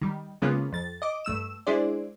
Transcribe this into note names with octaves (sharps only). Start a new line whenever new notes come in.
D#3 G3
C#3 G#3 A#3 B3 C#4 F4
F2 A6
D#5 D6
G2 A3 E6 E7
G#3 D4 E4 G#4 C5 D5